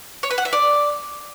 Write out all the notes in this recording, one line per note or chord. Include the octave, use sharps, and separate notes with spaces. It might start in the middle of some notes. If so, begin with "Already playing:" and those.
C#5
B4
F#5
E5
D5